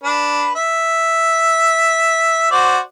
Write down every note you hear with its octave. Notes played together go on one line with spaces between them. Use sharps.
D4 B4
E5
F#4 C5 D5